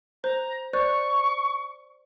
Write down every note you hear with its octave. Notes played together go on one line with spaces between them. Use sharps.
C5 A#5 F#6
C5 D5 C#6 F#6